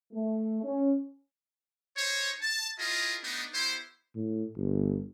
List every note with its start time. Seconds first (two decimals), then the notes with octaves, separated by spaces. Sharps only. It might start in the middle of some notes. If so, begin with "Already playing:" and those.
0.13 A3
0.63 C#4
1.96 D#4 C5 C#5
2.42 A5
2.79 E4 F4 G#4 A#4 D#5
3.23 A3 B3 D4 D#4
3.54 B3 E4 G4 C5
4.15 A2
4.56 G1